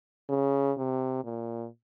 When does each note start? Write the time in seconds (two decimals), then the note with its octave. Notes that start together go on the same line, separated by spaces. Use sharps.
0.29 C#3
0.77 C3
1.24 A#2